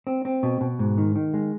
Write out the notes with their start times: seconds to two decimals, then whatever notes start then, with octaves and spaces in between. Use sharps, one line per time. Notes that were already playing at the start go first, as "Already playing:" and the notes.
0.07 C4
0.25 C4
0.43 B2
0.61 B2
0.79 G#2
0.98 D#3
1.16 D#3
1.34 G#3